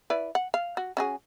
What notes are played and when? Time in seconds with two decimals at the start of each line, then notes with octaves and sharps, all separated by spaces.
0.10 E4 B4 D5
0.35 F#5
0.54 F5
0.77 F#4
0.97 C#4 F#4 G#4